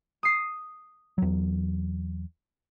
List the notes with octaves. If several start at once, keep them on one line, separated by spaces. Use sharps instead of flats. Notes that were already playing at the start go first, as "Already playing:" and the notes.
D#6 C7
E2 F#3